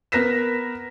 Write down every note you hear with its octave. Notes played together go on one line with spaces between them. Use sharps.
B3 A#4 B4 A#6 B6 E7